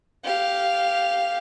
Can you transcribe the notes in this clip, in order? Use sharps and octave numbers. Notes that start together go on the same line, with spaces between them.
G4 F5